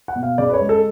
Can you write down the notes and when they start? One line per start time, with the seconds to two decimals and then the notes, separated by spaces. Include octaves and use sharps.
0.08 F#5
0.16 B2
0.23 F5
0.38 C#3 D5
0.49 B4
0.54 C#5
0.61 G#3
0.69 A4